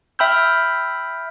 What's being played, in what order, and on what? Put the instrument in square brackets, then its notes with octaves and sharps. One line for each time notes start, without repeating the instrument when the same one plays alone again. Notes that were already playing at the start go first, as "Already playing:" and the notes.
[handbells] E5 G5 B5 E6 F6 G6